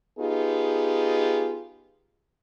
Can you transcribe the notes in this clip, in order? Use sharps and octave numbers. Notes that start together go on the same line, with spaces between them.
B3 D#4 F4 G4 G#4